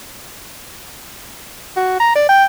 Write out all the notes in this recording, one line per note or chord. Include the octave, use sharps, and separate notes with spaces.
F#4
A#5
D5
G5